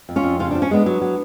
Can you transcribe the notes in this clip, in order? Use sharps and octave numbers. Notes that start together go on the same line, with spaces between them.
F2
C#4 F4
F2
C#3 F4
F3 D4
C#4
G#3 B3 D4
F#3
F#3